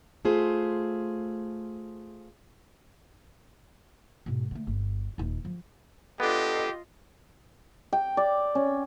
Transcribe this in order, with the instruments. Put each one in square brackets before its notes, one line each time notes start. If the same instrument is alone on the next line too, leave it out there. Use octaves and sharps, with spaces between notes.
[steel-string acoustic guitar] A3 F4 G#4 C5
[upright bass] G#2 B2
D3 A3
G1
D#1 D#4
F3
[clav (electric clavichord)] B3 D4 [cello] F4 D#5 [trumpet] G4 [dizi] A4
[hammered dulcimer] G5
D5
C#4